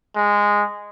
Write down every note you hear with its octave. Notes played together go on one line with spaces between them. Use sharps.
G#3